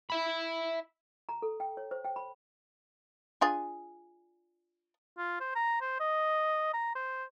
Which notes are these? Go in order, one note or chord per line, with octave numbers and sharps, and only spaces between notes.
E5 B5
A#5
A4
G5
C#5
C5
G5
B5
D4 F4 G#4
F4
C5
A#5
C5
D#5
A#5
C5